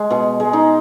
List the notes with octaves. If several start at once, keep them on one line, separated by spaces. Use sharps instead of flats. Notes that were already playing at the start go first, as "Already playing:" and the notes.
Already playing: G#3
B2 G#4
G#3
D#4